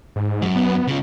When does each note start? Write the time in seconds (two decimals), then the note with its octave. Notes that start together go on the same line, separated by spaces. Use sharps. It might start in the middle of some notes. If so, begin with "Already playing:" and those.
0.16 G#2
0.42 F#2 F#3
0.56 B3
0.87 C#3 F4